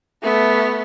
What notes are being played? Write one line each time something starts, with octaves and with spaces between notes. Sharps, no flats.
A3 B3